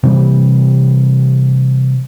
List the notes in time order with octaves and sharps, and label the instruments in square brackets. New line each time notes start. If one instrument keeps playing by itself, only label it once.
[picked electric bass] C3 E3 G3